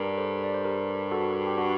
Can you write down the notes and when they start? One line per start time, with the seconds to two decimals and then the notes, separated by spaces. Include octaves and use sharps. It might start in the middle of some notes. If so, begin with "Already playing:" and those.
Already playing: G2 A#4 D5
0.18 A4 C5
0.44 D5
0.54 C5
0.65 G4 A#4
1.11 F#4 A4
1.47 G4
1.57 D4 F#4